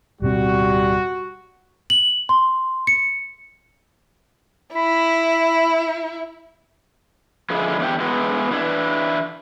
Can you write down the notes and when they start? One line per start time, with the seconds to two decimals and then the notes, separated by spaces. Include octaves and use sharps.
0.22 D1 B2 G3 C4 F#4
1.90 F#7
2.29 C6
2.87 C#7
4.75 E4 B5
7.50 D3 F3 G#3 E4 G#4
7.79 E2 G#3 C4 E4 G4
8.00 G#3 B3 E4 F#4
8.51 E3 D4 E4